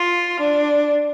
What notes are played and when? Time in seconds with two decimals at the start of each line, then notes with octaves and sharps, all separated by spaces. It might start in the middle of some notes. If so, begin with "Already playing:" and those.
Already playing: F4
0.39 D4